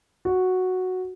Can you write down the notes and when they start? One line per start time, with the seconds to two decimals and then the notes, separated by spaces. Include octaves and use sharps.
0.25 F#4